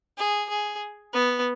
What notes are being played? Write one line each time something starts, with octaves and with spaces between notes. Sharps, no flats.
G#4
G#4
B3